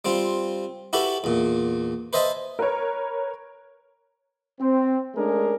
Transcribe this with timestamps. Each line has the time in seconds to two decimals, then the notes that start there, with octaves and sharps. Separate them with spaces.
0.05 G3 C4 F4
0.93 E4 F#4 G4 A4 B4
1.24 E2 A#2
2.13 B4 C5 D#5 E5 G#5 A5
2.59 A#4 B4 C#5
4.60 C4
5.15 G#3 A3 C#4 D4 G#4 A#4